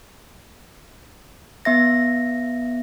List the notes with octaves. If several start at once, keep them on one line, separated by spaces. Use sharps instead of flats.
B3 E5 A#6